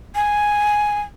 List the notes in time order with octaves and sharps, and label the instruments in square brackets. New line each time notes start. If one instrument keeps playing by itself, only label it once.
[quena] G#5